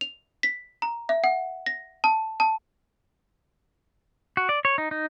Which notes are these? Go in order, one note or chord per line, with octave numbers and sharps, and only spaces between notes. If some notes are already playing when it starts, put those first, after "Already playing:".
F7
B6
A#5
E5
F#5
A#6
A5
A5
F#4
D5
C#5
D#4
D#4